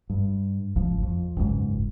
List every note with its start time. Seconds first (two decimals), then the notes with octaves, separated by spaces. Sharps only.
0.10 G2
0.76 G#1 C#2 F3
1.03 F2
1.37 F#1 C#2 G#2